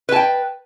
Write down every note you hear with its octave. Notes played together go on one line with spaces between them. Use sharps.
B4 G5 A5